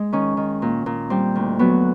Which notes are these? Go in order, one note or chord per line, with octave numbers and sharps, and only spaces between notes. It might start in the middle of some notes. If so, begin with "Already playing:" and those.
Already playing: G#3
D#3 C#4
D#3
A#2
A#2
G3 C4
D2
F#3 B3